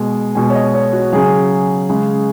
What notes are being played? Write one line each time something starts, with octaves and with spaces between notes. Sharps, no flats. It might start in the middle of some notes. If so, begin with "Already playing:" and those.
Already playing: B2 G#3
B2 G#3 G#5
C#5
D#5
C#5
F#4
C#3 F#3 G#4
C#3 G#3